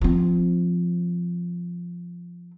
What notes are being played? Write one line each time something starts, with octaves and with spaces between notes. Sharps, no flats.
F3 C4